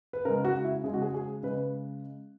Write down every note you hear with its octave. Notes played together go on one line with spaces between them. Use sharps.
B4
C#3 G#3 A#4
F#4
E4
C#3 G#3 G#4
F#4
G#4
G#4
C#3 G#3 B4